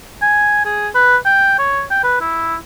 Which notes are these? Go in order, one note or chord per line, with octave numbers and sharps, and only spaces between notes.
G#5
G#4
B4
G5
C#5
G5
B4
E4